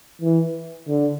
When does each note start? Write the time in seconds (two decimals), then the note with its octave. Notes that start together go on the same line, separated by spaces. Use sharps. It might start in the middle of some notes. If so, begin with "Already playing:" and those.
0.21 E3
0.88 D3